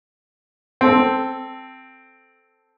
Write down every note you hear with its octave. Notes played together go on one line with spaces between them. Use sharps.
C4 A4